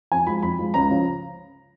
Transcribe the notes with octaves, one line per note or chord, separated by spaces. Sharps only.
F2 G#5
F3 G#3 B5
F2 B5
F3 G#3
C#2 A#5
C#3 F3